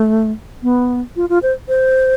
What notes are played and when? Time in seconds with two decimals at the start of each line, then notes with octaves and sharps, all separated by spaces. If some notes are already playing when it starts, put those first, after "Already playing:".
Already playing: A3
0.63 B3
1.16 F4
1.29 F4
1.43 C5
1.68 C5